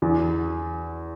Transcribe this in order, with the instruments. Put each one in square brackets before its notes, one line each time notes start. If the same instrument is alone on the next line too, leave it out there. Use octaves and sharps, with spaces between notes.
[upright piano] E2